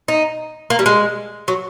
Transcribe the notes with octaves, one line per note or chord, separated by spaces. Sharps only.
D#4
A#3
G3
G#3
F#3